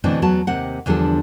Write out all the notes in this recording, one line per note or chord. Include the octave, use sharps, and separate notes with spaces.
B2 D3 E3 A3 C4 D4
E2 F#3 B3 F#4 A5
D#2 C3 C4 F#5
E2 D3 F3 G3 D4 A4